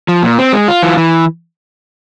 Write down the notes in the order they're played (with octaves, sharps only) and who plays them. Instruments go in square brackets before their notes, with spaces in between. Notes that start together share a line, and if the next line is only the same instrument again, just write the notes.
[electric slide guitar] F3
A#2
C4
G#3
F4
E3
E3